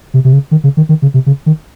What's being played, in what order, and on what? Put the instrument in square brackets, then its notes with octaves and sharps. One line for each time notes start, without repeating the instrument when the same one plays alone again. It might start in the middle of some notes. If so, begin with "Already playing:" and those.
[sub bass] C3
C3
C#3
D#3
C#3
D#3
D#3
C#3
C3
C#3
D#3